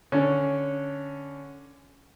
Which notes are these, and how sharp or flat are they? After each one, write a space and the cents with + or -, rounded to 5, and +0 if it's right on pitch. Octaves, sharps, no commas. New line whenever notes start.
D3 +0 C#4 +5